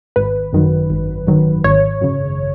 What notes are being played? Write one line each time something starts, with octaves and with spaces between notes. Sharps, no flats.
G#1 B4
F#2 D#3 F#3
G#1
F#2 D#3 F#3
G#1 C#5
F#2 C#3